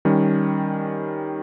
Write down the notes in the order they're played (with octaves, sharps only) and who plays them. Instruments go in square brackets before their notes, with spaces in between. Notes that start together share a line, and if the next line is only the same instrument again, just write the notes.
[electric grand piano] D#3 G3 C#4